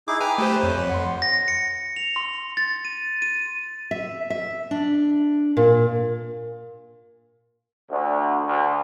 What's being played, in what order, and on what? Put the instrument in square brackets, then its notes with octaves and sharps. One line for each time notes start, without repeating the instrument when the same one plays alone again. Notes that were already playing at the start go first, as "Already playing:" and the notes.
[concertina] D#4 E4 G#4 [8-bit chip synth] D6
[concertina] B4 [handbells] G5 [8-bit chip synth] G#5 A#5
[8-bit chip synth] A3 G4 C5
[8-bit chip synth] F2 [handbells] C#5
[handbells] F#5 C6
[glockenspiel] A#6
C#7
F7
C6
A6
D#7
D#7
[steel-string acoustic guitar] E5
E5
D4
A#2
[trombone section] D2
D2